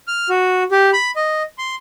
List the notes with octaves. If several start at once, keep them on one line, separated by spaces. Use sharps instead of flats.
F6
F#4
G4
B5
D#5
C6